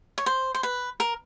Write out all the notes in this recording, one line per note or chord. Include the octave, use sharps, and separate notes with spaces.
C#5
C5
C5
B4
A#4